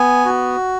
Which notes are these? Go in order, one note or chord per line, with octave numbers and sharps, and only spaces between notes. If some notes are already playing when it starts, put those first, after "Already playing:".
Already playing: B3 G#5
F#4